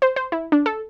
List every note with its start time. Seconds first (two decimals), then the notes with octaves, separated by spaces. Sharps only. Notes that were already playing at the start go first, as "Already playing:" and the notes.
0.02 C5
0.16 C5
0.32 E4
0.52 D4
0.66 A4